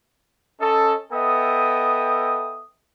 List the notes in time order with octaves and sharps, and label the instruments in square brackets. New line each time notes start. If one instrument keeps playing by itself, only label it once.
[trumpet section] C#4 A4 D#5
B3 A4 D#5 E5 G5 D#6